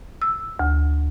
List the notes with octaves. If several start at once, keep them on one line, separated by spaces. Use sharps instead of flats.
E6
D2